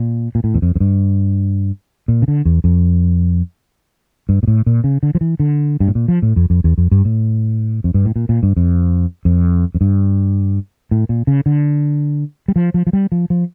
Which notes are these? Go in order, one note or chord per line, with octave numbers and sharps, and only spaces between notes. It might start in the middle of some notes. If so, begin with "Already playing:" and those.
Already playing: A#2
A#2
A2
E2
F2
F2
G2
A#2
C#3
D3
E2
F2
G2
A#2
A2
A#2
C#3
D3
F3
E3
D3
G2
A2
A#2
F3
A2
F2
F2
E2
F2
G2
A2
F2
G2
A2
A#2
A#2
G2
F2
F2
F2
G2
A2
A#2
C#3
D3
G3
F3
F3
F3
G3
F3
F3